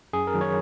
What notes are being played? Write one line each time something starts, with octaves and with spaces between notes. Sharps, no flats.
F#2 G#4
A#4
D#3 F#3
C#5